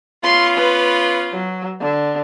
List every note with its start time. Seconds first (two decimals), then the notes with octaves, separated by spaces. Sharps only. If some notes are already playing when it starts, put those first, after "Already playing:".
0.24 B3 C#4 F4 C6
0.58 B4
1.33 F#3
1.81 D3